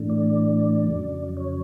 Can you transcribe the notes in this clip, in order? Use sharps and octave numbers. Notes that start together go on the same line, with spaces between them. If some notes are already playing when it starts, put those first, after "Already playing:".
Already playing: A2 E3 A3 D4
D5
F2 C#3 F#3
C#5